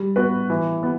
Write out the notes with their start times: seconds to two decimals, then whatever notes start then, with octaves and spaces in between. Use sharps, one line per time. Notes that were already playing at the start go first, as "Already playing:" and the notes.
Already playing: G3
0.16 B3 F#4 B4
0.50 E3
0.83 B3